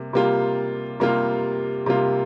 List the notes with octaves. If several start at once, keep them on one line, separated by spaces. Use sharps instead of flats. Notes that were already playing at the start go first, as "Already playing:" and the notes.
Already playing: C3 G3 A#3
C3 G3 A#3 F4
C3 G3 A#3 F4
C3 G3 A#3 F4